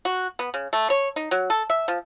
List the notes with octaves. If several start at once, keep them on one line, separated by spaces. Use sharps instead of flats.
F#4
B3
C#3
A3
C#5
D#4
F#3
A4
E5
F3